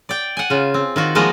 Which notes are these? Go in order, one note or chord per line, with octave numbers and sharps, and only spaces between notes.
D5 G5
F#5 G#5
C#3 F4
C4
D#3 F4 F#4
F3 G#3 A#3 B3 F#4 A#4